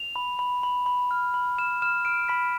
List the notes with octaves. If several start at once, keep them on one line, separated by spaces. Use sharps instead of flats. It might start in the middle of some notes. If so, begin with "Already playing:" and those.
Already playing: F7
B5
B5
B5
B5
F6
B5
F6 E7
F6 E7
F6 D7
B5 B6